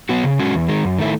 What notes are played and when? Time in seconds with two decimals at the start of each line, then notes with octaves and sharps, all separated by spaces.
0.09 F#3 B3 F#4
0.24 C#3
0.39 G#3 C#4 F#4
0.53 E2
0.69 D#3 G#3
0.84 F#2
0.99 D#3 A3 E4